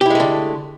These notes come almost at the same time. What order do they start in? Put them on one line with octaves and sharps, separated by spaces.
G4 E4 G#3 A3 D3